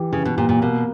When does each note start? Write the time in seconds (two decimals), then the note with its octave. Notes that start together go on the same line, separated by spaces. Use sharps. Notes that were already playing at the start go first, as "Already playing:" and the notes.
Already playing: E3 G4
0.12 C#3 E3
0.25 B2
0.37 A#2 G4
0.49 A#2
0.61 B2 A#3